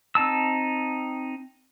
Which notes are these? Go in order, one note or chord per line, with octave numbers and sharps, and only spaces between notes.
C4 D#4 A5 E6